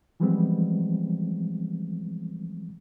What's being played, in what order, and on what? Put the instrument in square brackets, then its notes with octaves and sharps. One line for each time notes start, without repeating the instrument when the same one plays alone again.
[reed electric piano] E3 F3 G3 G#3 B3 C4